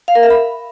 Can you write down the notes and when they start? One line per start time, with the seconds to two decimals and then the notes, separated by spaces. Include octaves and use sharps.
0.08 F5
0.15 A#4
0.23 E5
0.30 B5